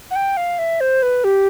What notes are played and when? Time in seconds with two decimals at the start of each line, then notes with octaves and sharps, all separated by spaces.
0.11 F#5
0.16 G5
0.37 F5
0.59 E5
0.81 C5
1.03 B4
1.24 G4